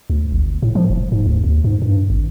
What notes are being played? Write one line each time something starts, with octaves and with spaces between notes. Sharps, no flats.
D2
G1
A2
F3
F1
G#2
D2
D#2
G#2
G2
G#1